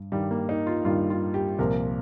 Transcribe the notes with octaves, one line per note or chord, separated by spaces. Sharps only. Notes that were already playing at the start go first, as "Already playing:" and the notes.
Already playing: G2
G2 D#3 G3
A#3
D#4
F4
G2 D#3 F4
F4
G4
C2 A#2 F3 A#4